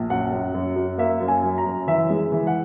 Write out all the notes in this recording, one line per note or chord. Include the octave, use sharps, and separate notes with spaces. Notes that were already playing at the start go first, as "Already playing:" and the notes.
Already playing: A#1
F#2 F#5
F#2
F#2
F#2
A#3 E5
F#2
G#5
F#3
A#5
F#2
E3 E5
G#3
E3
F#5